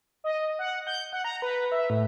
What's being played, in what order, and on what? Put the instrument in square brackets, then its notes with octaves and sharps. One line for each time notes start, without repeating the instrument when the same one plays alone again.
[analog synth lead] D#5
F#5
G6
F#5
A#5
B4
E5
A2